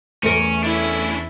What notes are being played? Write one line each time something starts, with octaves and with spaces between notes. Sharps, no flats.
E2 A3 C#4 A#4
C#4 D4 E4